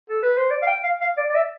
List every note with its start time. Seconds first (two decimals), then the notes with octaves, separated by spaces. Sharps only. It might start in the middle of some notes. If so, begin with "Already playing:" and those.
0.09 A4
0.23 B4
0.37 C5
0.51 D5
0.62 F5
0.67 G5
0.83 F5
1.01 F5
1.17 D5
1.30 D5
1.35 E5